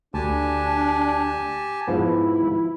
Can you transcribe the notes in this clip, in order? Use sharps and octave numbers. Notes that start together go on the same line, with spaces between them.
D2 D4 G4 G#5 A5
G#2 F3 B3 E4